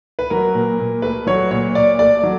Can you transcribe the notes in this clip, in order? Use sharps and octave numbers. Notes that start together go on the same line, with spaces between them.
B4
F#3 A#4
A#2
A#2
A3 B4
F#3 C#5
A#2 C#5
A#2 D5
A3 D5
F#3